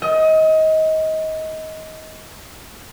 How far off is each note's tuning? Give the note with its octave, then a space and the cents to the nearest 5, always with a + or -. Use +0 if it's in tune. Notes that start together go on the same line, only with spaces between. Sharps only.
D#5 +25